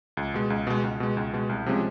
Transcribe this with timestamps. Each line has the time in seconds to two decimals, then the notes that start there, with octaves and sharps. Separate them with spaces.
0.17 C#2
0.34 B2 G#3
0.50 C#2
0.67 B2 G#3
0.83 C#2
1.00 B2 G#3
1.17 C#2
1.33 B2 G#3
1.49 C2
1.66 C3 F3 G#3 C#4